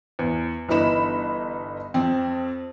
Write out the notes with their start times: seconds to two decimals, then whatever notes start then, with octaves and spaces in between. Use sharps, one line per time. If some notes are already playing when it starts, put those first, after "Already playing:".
0.19 E2
0.69 G1 E3 B3 D#4 B5 E7
1.94 F2 C4